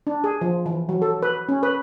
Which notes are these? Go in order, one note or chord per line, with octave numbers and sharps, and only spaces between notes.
D4
G#4
F3
E3
F#3
A4
B4
C#4
B4